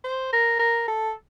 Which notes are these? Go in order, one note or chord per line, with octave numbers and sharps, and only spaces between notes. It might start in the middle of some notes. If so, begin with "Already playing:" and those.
C5
A#4
A#4
A4